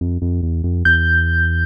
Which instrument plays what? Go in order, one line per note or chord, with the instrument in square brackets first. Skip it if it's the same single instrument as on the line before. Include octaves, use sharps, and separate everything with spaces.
[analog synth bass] F2
F2
E2
F2
[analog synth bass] E2 [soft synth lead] G6